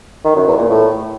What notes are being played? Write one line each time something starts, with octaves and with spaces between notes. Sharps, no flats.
D#3
F#2
E2
A#2
A2